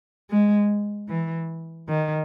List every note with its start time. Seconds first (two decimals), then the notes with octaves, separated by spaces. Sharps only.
0.30 G#3
1.09 E3
1.88 D#3